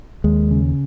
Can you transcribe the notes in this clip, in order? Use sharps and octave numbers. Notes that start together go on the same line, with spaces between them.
D#2 G#3
C#3